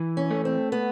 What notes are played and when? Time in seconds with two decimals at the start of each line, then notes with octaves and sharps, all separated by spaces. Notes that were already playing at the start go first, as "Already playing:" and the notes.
Already playing: E3
0.17 C#4
0.31 A3
0.45 C4
0.72 B3